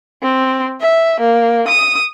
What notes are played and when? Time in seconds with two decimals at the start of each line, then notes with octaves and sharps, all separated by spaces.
0.23 C4
0.81 E5
1.20 A#3
1.68 D#6